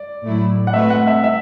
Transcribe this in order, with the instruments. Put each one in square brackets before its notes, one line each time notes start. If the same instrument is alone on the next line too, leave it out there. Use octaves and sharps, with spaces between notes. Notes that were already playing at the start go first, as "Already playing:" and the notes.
Already playing: [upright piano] D5
[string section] A2 F#3 A3 E4
[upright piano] F#5
[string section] A3 C4 F#4 B4 [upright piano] E5
[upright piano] F#5
E5
E5